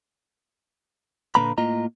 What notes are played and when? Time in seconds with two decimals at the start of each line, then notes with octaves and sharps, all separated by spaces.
1.35 A#2 D3 A#3 B4 A#5 B5
1.58 A2 A#3 F4 D#5 A#5